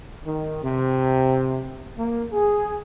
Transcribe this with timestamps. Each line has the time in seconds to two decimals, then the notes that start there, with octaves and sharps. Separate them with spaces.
0.25 D#3
0.63 C3
1.98 A#3
2.32 G#4